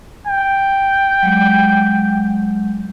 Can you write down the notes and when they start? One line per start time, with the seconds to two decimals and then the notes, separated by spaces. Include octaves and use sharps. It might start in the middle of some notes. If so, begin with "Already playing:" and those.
0.27 G5
1.22 F#3 G#3